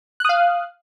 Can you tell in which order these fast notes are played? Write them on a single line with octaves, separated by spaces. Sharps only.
F#6 D#6 F5